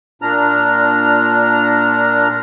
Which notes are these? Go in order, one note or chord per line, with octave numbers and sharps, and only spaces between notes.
A#2 D4 A#5 F6